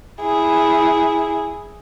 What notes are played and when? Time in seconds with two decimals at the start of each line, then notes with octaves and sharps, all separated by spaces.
0.21 E4 G#4